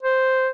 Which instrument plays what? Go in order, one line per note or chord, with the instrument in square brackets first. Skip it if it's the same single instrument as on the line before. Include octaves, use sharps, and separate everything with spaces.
[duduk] C5